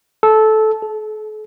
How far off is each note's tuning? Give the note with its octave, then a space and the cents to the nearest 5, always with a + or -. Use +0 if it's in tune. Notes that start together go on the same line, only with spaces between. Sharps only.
A4 -15
A4 -45